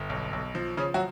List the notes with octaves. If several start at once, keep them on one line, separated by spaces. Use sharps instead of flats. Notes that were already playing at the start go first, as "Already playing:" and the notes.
Already playing: G1
B1
B1
F3
C#3 F3 C#4
F#3 F#4